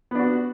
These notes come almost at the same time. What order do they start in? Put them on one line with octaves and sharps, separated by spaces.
B3 D4 F#4